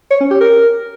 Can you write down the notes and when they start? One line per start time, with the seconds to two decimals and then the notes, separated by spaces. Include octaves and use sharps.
0.11 C#5
0.21 C#4
0.30 G4
0.40 A#4